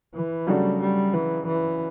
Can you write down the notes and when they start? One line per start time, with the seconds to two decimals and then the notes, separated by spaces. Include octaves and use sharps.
0.14 E3
0.47 C#3 F#3 G3 A3 D4 F#4
0.80 G3
1.13 E3
1.47 E3